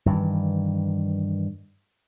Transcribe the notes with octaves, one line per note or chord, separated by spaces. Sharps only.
G2 D#3 E3